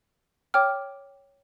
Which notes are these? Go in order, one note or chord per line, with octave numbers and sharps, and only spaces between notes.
C#5 G5 D6 F6